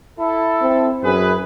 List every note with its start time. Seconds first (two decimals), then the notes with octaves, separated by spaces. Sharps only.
0.18 E4 A4
0.61 C4
1.03 F#2 G#4 B4